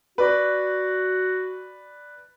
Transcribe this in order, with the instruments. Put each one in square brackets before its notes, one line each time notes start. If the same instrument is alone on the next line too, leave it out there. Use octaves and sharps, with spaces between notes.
[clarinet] F#4 [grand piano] B4 D5